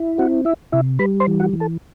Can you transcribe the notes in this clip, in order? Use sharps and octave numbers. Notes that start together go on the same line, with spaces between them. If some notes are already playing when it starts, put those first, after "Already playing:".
Already playing: E4
C4 F#4 F#5
E4 E5
C3 E4 E5
G3 B4 B5
C5 C6
E3
F#4 F#5
E3
A4 A5